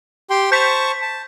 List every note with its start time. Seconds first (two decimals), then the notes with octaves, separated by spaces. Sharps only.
0.30 G4 G5 C6
0.52 C5 A5 C#6 G6 B6
1.02 A5